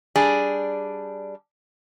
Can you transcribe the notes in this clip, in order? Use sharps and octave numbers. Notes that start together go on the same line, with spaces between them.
G3 D4 G#4